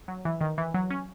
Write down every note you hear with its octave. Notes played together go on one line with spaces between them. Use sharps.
F#3
E3
D#3
E3
F#3
C#4